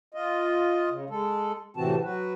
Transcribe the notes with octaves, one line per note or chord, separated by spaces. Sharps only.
F4 D#5
C#3
G#3 A4
A2 C3 E3 C4 F#4 A5
F#3 F#4 B4